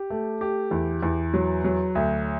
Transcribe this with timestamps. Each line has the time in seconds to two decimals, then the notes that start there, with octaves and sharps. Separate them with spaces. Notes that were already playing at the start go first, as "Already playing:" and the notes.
Already playing: G4
0.10 A3
0.41 G4
0.71 E2
1.03 E2
1.34 F#3
1.64 F#3
1.95 D2